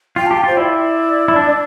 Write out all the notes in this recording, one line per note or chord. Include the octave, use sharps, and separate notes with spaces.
F4 G5
G4 A5
G5
F4 C5
E4 D5
E4
D4